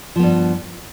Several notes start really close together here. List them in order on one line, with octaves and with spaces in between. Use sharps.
F3 B3 G2